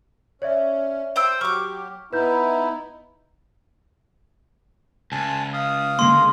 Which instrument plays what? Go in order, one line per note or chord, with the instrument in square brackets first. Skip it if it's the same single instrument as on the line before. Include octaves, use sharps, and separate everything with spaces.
[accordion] C#4 [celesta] C#5 D5 E5
[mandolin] C5 G5 E6
[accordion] F#3 G4 [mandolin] C#6 D6 [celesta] F6
[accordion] B3 D#4 E4 [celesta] B4 G6
[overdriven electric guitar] C#2 [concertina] G#5 A5
[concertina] F5 D#6
[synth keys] D3 G#3 A#3 [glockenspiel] C6